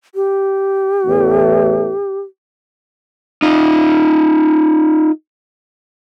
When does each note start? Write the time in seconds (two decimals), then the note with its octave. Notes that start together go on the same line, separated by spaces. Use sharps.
0.15 G4
1.06 A1 E2 A3
3.42 D#4 F4